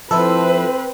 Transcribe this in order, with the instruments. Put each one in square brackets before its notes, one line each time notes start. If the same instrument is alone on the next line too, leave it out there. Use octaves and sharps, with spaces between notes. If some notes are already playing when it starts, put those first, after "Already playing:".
[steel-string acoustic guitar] F3 [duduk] C4 [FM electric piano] E4 A4 [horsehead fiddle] B4 C5